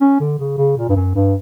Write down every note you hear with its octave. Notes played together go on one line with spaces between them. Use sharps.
C#4
D3
C#3
C#3
A#2
G2
F#2
G2